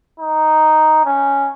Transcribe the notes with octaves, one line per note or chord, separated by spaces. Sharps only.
D#4
C#4